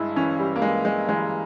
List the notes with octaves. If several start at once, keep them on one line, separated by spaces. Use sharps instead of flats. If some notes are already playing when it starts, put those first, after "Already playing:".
Already playing: G2 G#3 E4
E3 C#4
G3
A#3
G2 G#3
G#3
E3 G#3